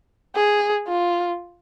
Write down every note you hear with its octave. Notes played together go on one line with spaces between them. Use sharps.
G#4
F4